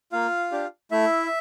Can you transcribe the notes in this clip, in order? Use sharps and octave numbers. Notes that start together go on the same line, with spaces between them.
A#3 F4 F5
D4 G4
A3 E4 E5